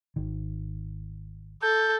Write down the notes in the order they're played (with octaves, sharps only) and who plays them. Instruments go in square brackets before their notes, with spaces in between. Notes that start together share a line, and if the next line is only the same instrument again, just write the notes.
[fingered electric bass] G#1 D#3
[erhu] A4 [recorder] G6